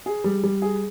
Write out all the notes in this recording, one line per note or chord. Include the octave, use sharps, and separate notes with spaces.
G#4
G3
G3
G#4